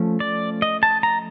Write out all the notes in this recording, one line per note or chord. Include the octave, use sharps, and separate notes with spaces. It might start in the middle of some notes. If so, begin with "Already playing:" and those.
Already playing: F3 A3 C#4
D5
D#5
A5
A#5